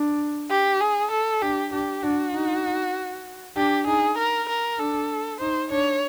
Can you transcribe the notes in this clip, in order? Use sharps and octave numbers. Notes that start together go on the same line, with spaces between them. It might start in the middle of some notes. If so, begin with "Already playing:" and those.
Already playing: D4
G4
G#4
A4
D4 G4
D4 G4
D4 F#4
D#4
D4 G4
D#4 G#4
A#4
A#4
D4 A4
D#4 C5
D4 C#5